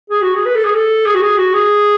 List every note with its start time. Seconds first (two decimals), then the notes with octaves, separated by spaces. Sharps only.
0.10 G#4
0.21 F#4
0.34 G#4
0.46 B4
0.55 A4
0.65 G#4
0.74 A4
1.05 G#4
1.14 F#4
1.21 G#4
1.37 F#4
1.53 G#4